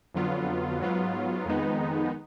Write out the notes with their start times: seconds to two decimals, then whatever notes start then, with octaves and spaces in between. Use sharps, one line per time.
0.14 F2 D3 F#3 B3 F4
0.80 G#2 F#3 B3 F4
1.46 F2 D#3 G#3 B3 D#4